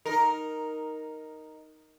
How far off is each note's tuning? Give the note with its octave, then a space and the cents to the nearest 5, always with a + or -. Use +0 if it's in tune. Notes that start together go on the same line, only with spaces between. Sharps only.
D#4 +0 A#4 +0